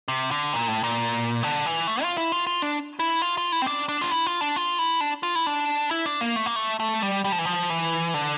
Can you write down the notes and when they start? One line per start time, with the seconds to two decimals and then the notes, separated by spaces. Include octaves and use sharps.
0.08 C3
0.31 D3
0.53 A#2
0.68 A2
0.83 A#2
1.43 D3
1.66 E3
1.87 A3
2.03 F4
2.18 E4
2.32 F4
2.47 F4
2.62 D4
2.99 E4
3.22 F4
3.37 F4
3.52 E4
3.62 C4
3.66 D4
3.89 D4
4.01 F4
4.11 E4
4.27 F4
4.41 D4
4.56 F4
4.79 E4
5.01 D4
5.23 F4
5.35 E4
5.46 D4
5.91 E4
6.06 D4
6.21 A#3
6.36 A3
6.46 A#3
6.56 A3
6.80 A3
7.02 G3
7.24 G3
7.32 F3
7.38 E3
7.45 F3
7.70 E3
8.14 D3